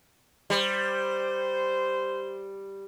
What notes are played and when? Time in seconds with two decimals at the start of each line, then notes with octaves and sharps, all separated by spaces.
0.50 G3 C5